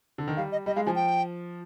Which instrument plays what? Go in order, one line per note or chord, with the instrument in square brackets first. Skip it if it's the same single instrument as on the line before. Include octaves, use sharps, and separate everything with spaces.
[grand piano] D3
D#3
[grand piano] G3 [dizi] F5
[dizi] D#5
[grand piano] G3 [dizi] D#5
[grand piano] G#3 [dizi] F5
[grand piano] F3 [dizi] G#5
[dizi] G5